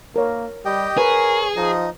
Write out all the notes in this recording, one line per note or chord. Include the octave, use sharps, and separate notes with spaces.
A#3 A#4 C#5
G3 G4 D#5 G5
G#4 A#4 B4 C#5
F3 D#4 D#5